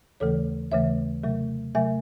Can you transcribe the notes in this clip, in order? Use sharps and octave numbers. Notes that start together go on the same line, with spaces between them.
D#2 C#3 E3 A3 A4 C#5
D#2 C#3 E3 A3 C#5 E5
C3 F#3 A3
C3 F#3 A3 E5 G#5